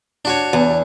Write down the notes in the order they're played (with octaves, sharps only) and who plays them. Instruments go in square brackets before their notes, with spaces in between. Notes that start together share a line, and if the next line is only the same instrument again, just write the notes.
[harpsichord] D4 F#4 C#5
[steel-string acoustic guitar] E2